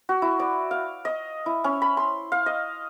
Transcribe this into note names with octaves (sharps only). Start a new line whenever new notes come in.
F#4
E4
D5
F5
D#5
E4
C#4
B5
C6
F5
D#5